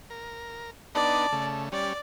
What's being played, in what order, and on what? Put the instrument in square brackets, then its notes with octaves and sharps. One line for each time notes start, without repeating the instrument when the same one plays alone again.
[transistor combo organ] A#4
[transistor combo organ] B3 D4 D#4 [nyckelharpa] D5 [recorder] A5
[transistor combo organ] C#3 A3
[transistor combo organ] G3 C#4 [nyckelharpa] D5